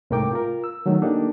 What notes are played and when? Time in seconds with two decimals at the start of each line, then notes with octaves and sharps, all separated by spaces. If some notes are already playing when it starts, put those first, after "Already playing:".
0.11 C2 G#2 A3 A#4 G5 D6
0.33 F4 A#4
0.64 E6
0.86 D#3 F#3 A3 D#4
1.02 A#3 D4 D#4 G4 A4